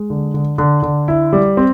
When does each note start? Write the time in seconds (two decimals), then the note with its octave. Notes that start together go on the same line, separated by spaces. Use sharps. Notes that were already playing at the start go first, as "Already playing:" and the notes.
Already playing: G#3
0.10 D3
0.34 D3
0.58 D3
0.83 D3
1.08 E4
1.33 G3
1.57 C4